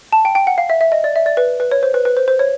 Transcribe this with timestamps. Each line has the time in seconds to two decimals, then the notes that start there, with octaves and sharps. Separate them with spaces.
0.12 A5
0.25 G5
0.35 G5
0.47 F#5
0.58 F5
0.70 E5
0.81 E5
0.92 D#5
1.04 D5
1.16 E5
1.26 D5
1.37 B4
1.60 B4
1.71 C#5
1.83 C5
1.94 B4
2.05 B4
2.17 C5
2.28 C5
2.39 C#5